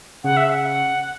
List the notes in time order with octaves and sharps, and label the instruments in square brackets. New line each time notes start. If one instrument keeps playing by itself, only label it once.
[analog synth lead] C#3 [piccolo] F#5
[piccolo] E5
F#5